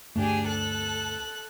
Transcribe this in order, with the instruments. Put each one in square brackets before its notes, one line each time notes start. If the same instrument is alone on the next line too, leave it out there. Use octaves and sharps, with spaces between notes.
[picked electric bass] D2 G2 A3 [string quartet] D4 G4 G#4
[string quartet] A4 F#6